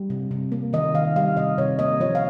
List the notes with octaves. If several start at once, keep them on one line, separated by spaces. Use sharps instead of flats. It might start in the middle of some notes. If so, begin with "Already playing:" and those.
Already playing: G3
C3
C3
A#3
D#3 D#5
D#3 F5
G3 F5
C3 D#5
C3 C#5
A#3 D#5
F3 C#5
F5